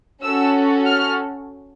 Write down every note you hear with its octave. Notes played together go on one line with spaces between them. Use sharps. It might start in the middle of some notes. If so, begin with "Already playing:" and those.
C#4 F#4 A4 E6
F6